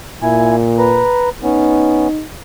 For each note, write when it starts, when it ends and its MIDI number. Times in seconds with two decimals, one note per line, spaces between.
0.22 1.08 46
0.22 0.56 64
0.22 0.56 80
0.78 1.29 71
0.78 1.29 82
1.43 2.08 59
1.43 2.08 61
1.43 2.23 63